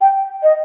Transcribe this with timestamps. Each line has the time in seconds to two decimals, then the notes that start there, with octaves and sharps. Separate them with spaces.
0.01 G5
0.43 D#5